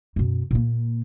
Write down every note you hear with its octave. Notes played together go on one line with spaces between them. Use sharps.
F#2 B2
A#2 A#3